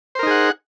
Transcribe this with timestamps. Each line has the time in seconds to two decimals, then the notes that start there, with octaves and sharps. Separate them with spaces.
0.15 C5
0.19 A#4
0.23 D#4
0.27 G#4
0.31 F#5